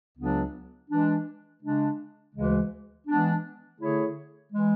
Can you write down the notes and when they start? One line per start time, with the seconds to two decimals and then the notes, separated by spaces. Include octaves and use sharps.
0.17 C#2 C#3 F#3 B3 D4
0.90 E3 G#3 D4
1.62 C#3 G#3 D4
2.35 D2 C#3 E3 G#3
3.07 E3 G#3 B3 D4
3.80 D3 A3 E4 G#4 C#5
4.52 E3 G#3